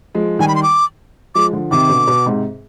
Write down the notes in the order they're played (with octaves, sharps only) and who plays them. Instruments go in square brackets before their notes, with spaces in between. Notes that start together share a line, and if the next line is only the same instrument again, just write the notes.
[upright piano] F3 G#3
[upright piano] D#3 G3 [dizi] G#5
[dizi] B5
C6
D6
[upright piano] F3 G#3 [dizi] D6
[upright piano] D3 F3
[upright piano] C3 D#3 [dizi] D6
[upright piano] B2 D3
B2
G#2 C3